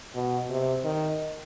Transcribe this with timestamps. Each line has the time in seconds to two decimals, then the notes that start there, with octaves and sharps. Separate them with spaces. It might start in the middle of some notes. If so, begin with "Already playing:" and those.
0.15 B2
0.50 C3
0.84 D#3